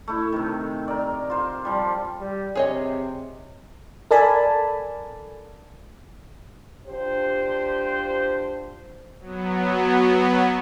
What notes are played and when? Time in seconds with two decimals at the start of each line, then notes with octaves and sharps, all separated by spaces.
0.08 A3 E4
0.32 C3 D#3
0.88 A#4 D5
1.30 F4 C5
1.65 F3 G3
2.20 G3
2.55 C3 G#4 C#5 D#5
4.11 A4 A#4 D5 G#5 A5 B5
6.87 D4 F4 G4 C5
9.20 F#3 B3